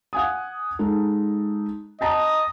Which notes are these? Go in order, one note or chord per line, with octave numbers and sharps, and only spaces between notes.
F#5 G#5 D#6
G#3 D#4 A4
D#5 G5 A5 A#5